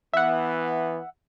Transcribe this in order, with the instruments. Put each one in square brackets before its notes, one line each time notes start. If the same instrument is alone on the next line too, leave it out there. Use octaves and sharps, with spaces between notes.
[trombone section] E3 B3 [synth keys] E5 F#5